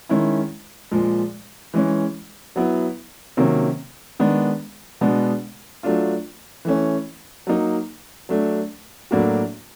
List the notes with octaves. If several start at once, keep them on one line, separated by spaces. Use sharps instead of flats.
D#3 G#3 C#4 E4
A#2 F3 G#3
E3 G#3 C#4
F#3 B3 E4
C3 D#3 F#3 A#3 C#4
D#3 G#3 B3 D4
B2 G#3 B3 D4
F#3 A3 D4 F4
E3 A3 C#4
F#3 A#3 D#4
F#3 A3 D4
A2 F#3 A#3 D4 F#4